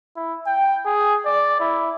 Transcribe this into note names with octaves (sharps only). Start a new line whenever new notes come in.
E4
G5
G#4
D5
E4